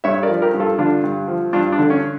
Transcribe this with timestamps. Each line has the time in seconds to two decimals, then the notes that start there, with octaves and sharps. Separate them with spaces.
0.04 G2 C#5 E5
0.23 A#4 D5
0.29 F3
0.42 G4 A#4
0.54 G2
0.60 F4 A4
0.78 D3 D4 F4
1.04 G2
1.28 F3
1.53 G2 D4 F4
1.72 D4
1.78 D3
1.90 C#4